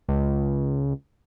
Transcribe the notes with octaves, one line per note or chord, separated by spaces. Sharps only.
C#2